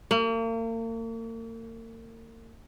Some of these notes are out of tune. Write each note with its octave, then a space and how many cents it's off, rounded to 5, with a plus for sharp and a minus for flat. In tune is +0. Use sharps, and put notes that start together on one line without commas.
A#3 -40